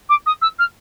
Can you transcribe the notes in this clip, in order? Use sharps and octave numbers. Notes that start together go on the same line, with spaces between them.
D6
D#6
E6
F6